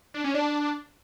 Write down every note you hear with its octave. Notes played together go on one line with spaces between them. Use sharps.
D4
C#4
D4